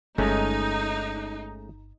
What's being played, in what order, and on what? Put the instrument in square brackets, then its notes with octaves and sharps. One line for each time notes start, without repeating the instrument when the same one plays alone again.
[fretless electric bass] G1 [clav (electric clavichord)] G#3 A3 C#4 [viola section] D#4